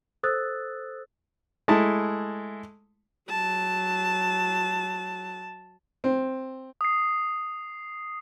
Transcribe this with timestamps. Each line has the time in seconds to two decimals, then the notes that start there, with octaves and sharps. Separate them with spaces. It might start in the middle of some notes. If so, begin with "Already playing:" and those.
0.23 A4 C5 D#6 E6 F#6 A6
1.68 G#3 A3 E4 A5
3.29 F#3 A5
6.04 C4
6.81 D#6 C7